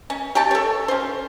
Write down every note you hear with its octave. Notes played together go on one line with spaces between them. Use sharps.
C#4
G4 C#5 G5 A5
A4 C#5
C#4 F#4 C5